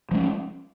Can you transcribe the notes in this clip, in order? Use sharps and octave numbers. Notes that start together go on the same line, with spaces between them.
F3 G#3 C#4